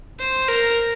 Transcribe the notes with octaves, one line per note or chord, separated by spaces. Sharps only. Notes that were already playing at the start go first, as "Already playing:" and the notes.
C5
A#4